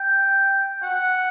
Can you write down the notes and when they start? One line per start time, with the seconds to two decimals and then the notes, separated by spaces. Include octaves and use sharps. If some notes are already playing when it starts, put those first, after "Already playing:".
Already playing: G5
0.83 F#5